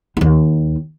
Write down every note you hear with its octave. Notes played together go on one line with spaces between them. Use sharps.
D#2 D#4